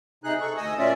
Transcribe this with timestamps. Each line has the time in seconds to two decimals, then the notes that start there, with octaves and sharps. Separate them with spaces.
0.24 C3 D#4 G#4 F#6
0.41 A4 C#6
0.57 D2 D#5 G#5 D#6 E6
0.78 A#2 C#4 F4 D5 E5